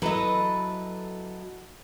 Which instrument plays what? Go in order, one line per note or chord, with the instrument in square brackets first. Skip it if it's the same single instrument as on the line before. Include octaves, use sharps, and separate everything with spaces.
[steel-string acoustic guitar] F#3 A4 D#5 [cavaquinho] E4 B4 A#5